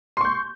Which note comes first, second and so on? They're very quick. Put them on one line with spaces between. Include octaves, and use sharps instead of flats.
C6 C#6 G6